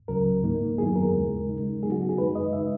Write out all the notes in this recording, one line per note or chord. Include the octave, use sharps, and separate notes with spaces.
C#2 C#3 F#3 A#4
G#2 D#3 A#3 D#4
F#2 D#3 F#3 B3 E4 G#4
A#4
D#2 C#3 G#3
C#3 G#3 D#4
C#3 F#3 B3 D#4 G#4
F#4
G#4
F#2 D#3 G#3 D#4 B4
D#5
C#3 G#3 D#4 E5